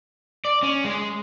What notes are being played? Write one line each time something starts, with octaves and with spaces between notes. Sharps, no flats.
D5
C#4
G#3